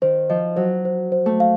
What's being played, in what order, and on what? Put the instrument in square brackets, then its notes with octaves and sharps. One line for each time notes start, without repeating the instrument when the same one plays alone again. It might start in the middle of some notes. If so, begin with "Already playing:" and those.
[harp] D#3 [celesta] C5
[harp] F3 [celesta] D#5
[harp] F#3 [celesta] C5
[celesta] C5
C5
[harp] A3
[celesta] F5